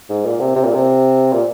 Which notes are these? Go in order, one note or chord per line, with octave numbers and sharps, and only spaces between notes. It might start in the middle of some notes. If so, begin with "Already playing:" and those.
G#2
A#2
C3
C3
A#2
C3
A#2